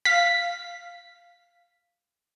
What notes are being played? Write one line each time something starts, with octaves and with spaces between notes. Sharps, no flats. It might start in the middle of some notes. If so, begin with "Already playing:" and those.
F5 B6